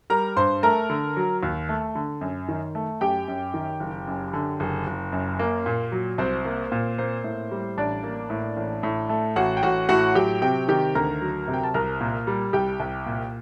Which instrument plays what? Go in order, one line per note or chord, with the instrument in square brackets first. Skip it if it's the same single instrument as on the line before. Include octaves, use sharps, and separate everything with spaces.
[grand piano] G3 A#4 A#5
G2 C5 C6
A3 A#4 A#5
D3
F#3
D#2
A3
D3
F#2
D#3
A3
F#2 G4 G5
F#2
D#3
F#1
F#2
D3
F#1
F#1
F#2
A#3
A#2
F#3
C2 C4 C5
A#3
A#2
A#3 C4 C5
A2
G3
A1 D4 D5
A#3
A2
A1
A2
A3
A1 F#4 F#5
G5
A1 F#4 F#5
A2 F#4 F#5
F#3 G4 G5
C3 G4 G5
D#3 G4 G5
D2 A#4 A#5
F#3
C3
G5
A5
C2 A#4 A#5
A#2
G3
C2 G4 G5
C2
A#2